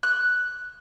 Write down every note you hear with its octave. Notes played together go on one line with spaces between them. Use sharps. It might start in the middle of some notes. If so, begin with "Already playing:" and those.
F#6